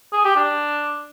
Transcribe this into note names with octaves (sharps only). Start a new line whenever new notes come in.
G#4
G4
D4